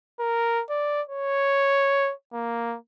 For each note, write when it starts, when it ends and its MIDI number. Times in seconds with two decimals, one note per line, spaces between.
0.20 0.63 70
0.70 1.02 74
1.09 2.12 73
2.33 2.76 58